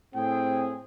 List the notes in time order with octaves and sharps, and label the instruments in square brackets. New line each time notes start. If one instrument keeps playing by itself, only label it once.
[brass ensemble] A2 C4 G#4 [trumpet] G5